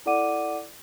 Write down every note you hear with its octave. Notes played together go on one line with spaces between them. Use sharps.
E4 A4 D5 F#5 D6 D#7